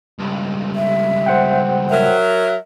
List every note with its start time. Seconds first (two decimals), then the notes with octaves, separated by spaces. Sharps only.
0.19 C#2 G2
0.75 E5
1.26 C5 F#5 G5
1.90 F#3 A#4 E5